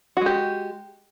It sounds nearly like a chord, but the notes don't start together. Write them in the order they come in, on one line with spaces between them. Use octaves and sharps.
F#4 G#3 G4